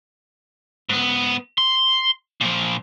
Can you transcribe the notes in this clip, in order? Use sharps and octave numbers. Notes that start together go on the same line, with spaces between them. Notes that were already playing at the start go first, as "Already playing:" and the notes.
G#2 B3
C6
A#2 F3